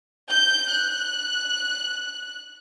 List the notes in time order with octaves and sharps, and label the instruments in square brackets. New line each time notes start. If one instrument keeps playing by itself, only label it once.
[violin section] G6
F#6